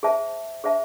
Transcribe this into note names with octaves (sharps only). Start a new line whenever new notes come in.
G#4 C5 E5 A5
G#4 C5 E5 A5